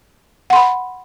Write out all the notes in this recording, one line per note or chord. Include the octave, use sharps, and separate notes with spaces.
F#5 B5 C6